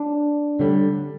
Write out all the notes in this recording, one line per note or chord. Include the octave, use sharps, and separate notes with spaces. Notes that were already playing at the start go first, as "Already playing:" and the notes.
Already playing: D4
D3 G3